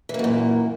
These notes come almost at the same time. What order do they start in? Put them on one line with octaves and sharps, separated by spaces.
E3 A#3 F#2 A#2